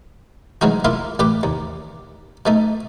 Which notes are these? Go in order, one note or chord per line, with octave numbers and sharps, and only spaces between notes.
E3 F#3 G#3 D#4 F#4
A#3 E4 F4
A1 G4 B4 D6
D#2
B2 A3 D#4